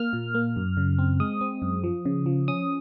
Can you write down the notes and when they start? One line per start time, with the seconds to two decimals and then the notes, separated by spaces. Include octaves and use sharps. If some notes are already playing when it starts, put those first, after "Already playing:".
Already playing: A#3 F6
0.13 A#2
0.35 A#3
0.56 F#2
0.77 C#3
0.99 C4
1.20 G#3 D#6
1.41 C4
1.62 F#2
1.84 F3
2.05 C#3
2.26 F3
2.48 C#4 D#6